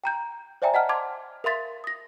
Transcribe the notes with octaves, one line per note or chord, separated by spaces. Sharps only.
G5 A#5 G6
C5 D5 E5 G5 G#5 A#5
D#5 F#5 A5 F6
A5 C6 D6 G#6
A#4 E5 F5 C6 A6 B6
D#6 A#6